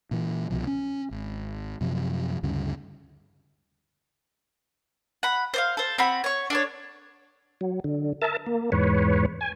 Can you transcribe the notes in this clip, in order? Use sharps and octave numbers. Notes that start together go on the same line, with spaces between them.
A#2 E3
C2 B2 F3
C#4
G#1
F#2 C3 F3
D2 G2 C#3
F#5 B5
C5 D5 F5
A4 C5
C4 F#4 B5
C#5 C#6
D4 A4 C#5
F#3
D3
A#4 E5 A5
A#3
E2 G#2 B4 C#5
G#5